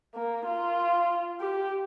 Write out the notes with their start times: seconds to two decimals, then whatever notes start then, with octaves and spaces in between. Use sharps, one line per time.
0.15 A#3
0.46 F4
1.40 G4